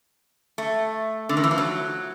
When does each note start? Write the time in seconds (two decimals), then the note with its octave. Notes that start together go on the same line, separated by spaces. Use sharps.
0.58 A3
1.29 D3
1.37 D#3
1.44 E3
1.51 F3
1.58 F#3